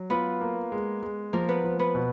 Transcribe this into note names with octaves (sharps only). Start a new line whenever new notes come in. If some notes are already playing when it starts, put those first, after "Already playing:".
Already playing: F#3
B3 F4 B4
A#3
G#3
G#3
F3 A#3 A#4
B3 B4
F3
B3 B4
B2